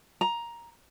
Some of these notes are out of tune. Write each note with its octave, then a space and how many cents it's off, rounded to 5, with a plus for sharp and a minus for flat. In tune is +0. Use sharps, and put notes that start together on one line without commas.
A#5 +10